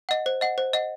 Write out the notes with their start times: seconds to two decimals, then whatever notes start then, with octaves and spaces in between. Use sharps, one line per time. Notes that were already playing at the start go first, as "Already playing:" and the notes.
0.09 D#5 F#5
0.26 C5
0.41 D#5 F#5
0.58 C5
0.73 D#5 F#5